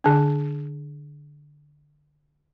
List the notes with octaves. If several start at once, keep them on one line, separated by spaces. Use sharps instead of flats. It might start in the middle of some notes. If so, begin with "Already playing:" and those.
D3 D4